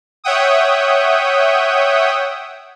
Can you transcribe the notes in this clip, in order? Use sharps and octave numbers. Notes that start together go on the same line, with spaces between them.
C#5 E5 F#5 G5 D#6